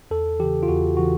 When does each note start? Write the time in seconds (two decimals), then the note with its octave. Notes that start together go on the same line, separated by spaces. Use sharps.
0.11 E2 A4
0.39 C#3 E3 G4
0.63 F4
0.68 E2 F#4
0.97 C#3 E3 F#4